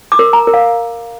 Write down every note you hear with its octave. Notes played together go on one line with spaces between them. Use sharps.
D6
A#4
A#5
A#4
F5